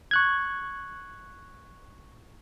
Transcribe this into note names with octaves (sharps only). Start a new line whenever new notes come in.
C#6 F#6 G#6